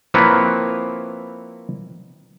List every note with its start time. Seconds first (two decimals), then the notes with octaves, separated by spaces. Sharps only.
0.14 F3 A#3 C4 E4 B4 C#5